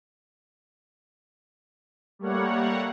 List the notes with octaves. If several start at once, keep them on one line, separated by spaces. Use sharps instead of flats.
G3 A3 A#3 C#5 F#5